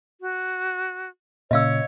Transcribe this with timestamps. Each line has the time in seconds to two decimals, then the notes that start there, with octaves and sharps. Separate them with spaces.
0.21 F#4
1.51 A#2 C#3 C#5 D#5 F5 E6